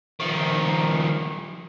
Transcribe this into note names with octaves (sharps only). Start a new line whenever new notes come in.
D#3 F3